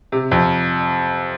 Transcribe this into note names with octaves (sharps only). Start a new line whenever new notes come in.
C3
F2